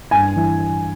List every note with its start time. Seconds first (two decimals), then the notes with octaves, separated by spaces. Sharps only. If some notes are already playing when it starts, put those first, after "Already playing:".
0.11 G2 G#5
0.36 E3